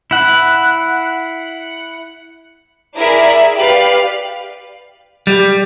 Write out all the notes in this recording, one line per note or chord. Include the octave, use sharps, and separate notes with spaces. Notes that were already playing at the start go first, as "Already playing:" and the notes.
E4 F#5
E4 G#4 A#4 D5 E5
G4 B4 D5 F5
G3